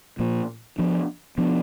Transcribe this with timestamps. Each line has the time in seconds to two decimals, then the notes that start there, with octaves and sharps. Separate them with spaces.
0.19 A#2 F3 A#3
0.78 F3 B3 D4
1.38 F3 B3 D4